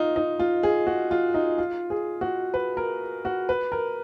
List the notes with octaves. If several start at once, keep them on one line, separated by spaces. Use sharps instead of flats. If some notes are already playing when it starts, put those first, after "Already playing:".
Already playing: D#4 F4
D#4
F4
G#4
F#4
F4
D#4
F4
G#4
F#4
B4
A#4
F#4
B4
A#4